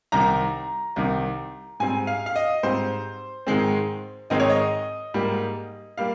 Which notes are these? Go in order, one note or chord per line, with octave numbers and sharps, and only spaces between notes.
C2 C3 D#3 A#5
C2 C3 D#3
G#2 G3 C4 G#5
F5
F5
D#5
G#2 G3 C4 C5
G#2 D#3 G#3 C4
G#2 D#3 G#3 C4 D#5
C#5
D#5
G#2 G3 A#3
G3 A#3 F5